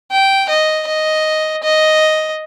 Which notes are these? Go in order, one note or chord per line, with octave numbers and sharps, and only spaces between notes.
G5
D#5
D#5
D#5